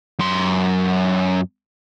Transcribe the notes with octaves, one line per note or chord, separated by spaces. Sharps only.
F#2 C6